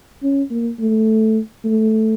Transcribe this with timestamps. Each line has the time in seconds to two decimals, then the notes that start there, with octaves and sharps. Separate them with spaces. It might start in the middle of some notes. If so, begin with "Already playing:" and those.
0.22 C#4
0.50 A#3
0.79 A3
1.64 A3